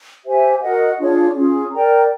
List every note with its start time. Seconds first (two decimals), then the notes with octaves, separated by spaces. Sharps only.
0.25 G4 C5 E5 G#5
0.61 F#4 A#4 D#5 F#5
0.98 D4 F4 G#4 C#5
1.35 C#4 F4 G#4
1.72 A#4 D5 G5 A#5